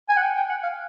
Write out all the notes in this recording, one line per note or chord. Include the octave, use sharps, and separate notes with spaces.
G#5
F#5
G5
G5
F#5
F5